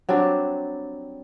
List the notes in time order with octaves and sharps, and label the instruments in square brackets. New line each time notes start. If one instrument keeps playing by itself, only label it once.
[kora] F#3 G3 C4 D4